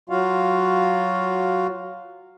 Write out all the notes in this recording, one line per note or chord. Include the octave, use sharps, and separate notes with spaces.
F#3 F4 F#4 F5